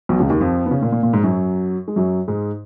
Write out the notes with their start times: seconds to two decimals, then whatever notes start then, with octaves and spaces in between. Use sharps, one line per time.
0.09 B1 B2
0.20 C#2 C#3
0.30 D#2 D#3
0.40 F2 F3
0.66 B3
0.71 C#3 C#4
0.81 A#2 A#3
0.92 A#2 A#3
1.03 A#2 A#3
1.13 G#2 G#3
1.23 F#2 F#3
1.88 G#3
1.96 F#2 F#3
2.28 G#2 G#3